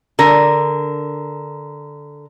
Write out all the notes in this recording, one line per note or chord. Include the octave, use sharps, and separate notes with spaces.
D3 A#4